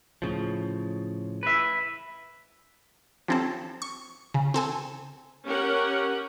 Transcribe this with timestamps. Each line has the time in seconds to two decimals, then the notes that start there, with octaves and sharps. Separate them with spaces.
0.22 A2 C#3 F3
1.43 B4 E5
3.28 F3 G3 C4 C#4 A4
3.82 C#6
4.34 C#3
4.54 C4 A4 G#5
5.46 C#4 G4 A#4 F#5